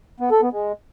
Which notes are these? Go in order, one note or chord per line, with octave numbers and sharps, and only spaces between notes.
B3
A4
B3
G#3